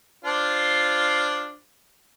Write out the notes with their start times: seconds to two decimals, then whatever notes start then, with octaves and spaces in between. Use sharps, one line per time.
0.24 D4 F4 C5